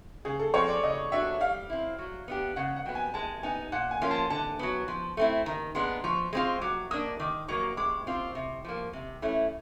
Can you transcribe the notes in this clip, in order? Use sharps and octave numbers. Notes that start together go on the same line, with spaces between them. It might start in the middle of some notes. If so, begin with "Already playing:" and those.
C#3 G#4
A4
F3 G#3 C4 C#5
D5
C#3 D#5
F#3 B3 D4 F#4 E5
G3 F5
C4 E4
F#3
B3 D4 G4
C#3 F#5
F#5
F#3 B3 G5
G#5
G#3 A5
B3 D#4 G#5
A#2 F#5
G#5
F3 A#3 C#4 F4
A5
D3 A5
F#3 B3
F3
A3 C4 E4
D#3 A#5
G#3 B3 D4 C6
F3 C#6
G#3 C4 F4
F#3 D6
A#3 D4 D#6
D#3 D6
F#3 A#3 C#6
G#3 D6
C4 F4
C3
F3 A#3
C3
E3 A3 C#4 E4